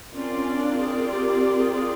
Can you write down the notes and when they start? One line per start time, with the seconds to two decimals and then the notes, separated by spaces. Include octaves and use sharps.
0.14 C4 C#4 F4 A#4 D5
0.35 C#4
0.57 D4
0.78 G#4
1.10 G4
1.41 G4
1.58 G#4
1.73 G#4